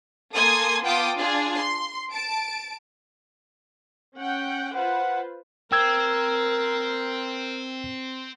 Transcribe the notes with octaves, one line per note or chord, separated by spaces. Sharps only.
A#3 A4 G#5 C6 D#6 G#6
B3 F4 G5 A5 D6 D#6
D4 F4 G#4
C6
A5 D7
C#4 F#5 G5
F4 B4 C5 F#5
C4 A#4 G5 E6 G#6